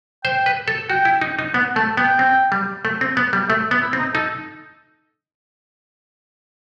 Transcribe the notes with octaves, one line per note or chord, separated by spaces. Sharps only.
C5 G5
B4
A4
F#4 G5
E4
D#4
D#4
B3 F#5
A3 A5
B3 G5
C4
G3
A3
C4
B3
G3
A3 E5
B3
E4
C4
D#4
D#4 A4